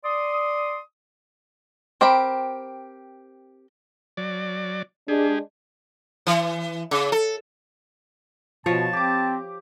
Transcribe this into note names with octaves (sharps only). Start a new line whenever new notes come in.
D5 C6 D#6
C4 G4 A#4 G5 B5
F#3 D5
G#3 D4 G4 G#4
E3
C#3
A4
B2 F3 C#5 A5
C4 G4 D6